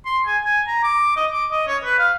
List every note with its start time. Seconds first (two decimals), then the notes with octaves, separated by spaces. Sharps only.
0.05 C6
0.26 G#5
0.45 G#5
0.67 A#5
0.83 D6
1.16 D#5
1.32 D6
1.51 D#5
1.67 C#5
1.84 B4
1.98 F5